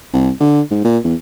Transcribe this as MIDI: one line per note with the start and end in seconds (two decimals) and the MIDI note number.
0.13 0.30 36
0.41 0.61 50
0.71 0.83 44
0.85 0.98 46
1.04 1.14 40